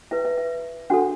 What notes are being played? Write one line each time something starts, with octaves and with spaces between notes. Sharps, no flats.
E4 B4 E5
E5
E5
D4 F#4 A4 F#5